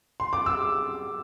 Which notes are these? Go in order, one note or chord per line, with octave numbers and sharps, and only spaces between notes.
C6
D6
E6